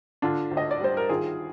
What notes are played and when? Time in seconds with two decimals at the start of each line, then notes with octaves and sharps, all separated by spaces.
0.22 D3 D4 F4
0.51 D2
0.57 D#5
0.71 D5
0.81 G3 C5
0.97 A#4
1.09 D#3 F4 G#4